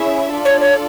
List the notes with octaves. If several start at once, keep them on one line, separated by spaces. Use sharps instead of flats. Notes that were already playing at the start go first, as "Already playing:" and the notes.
Already playing: C#4 E4 G#4 C#5 E5
D4 F4 A4 D5
C#5
C#5